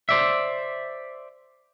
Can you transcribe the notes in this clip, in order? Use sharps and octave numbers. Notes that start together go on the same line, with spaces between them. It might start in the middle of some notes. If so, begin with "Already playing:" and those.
C5 D5 E5